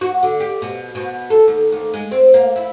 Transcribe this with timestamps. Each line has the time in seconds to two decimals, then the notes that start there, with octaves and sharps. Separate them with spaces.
0.01 F#4
0.23 D3
0.40 G4
0.62 B2
0.95 B2
1.30 A4
1.48 D#2
1.72 D#2
1.94 G#3
2.11 C4
2.34 A#3
2.56 E4